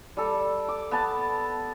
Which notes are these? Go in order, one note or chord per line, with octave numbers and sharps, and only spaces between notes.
G3 A4
D6
B3 A5